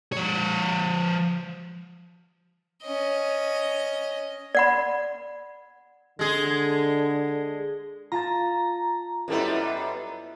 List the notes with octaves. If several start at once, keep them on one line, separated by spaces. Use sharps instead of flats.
F3 C#5
C#4 D#5
D5 F#5 B5
D3 G#3 G#4
F4 A5 A#5 A6
F#2 G3 B3 E4 A4 D#5